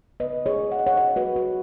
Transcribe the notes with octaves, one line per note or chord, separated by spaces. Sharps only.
C#3 B3 B4 D#5
G#4 C#5
F#5
D#5
C#5 F#5
C#5 F#5
F#4 B4
F#4 B4